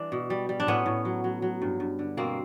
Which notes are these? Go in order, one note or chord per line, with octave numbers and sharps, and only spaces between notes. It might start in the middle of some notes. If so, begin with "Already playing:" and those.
Already playing: E3 G3 D4
B2
G3
G3
D4
A2 B3 C#4
A2
F#3
F#3
F#3
G2
G2
D3
B2 A#3 C4